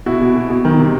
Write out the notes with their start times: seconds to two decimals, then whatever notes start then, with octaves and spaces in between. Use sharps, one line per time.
0.06 B2 E4 F#4
0.21 B2
0.35 B2
0.50 B2
0.65 D#3
0.79 C3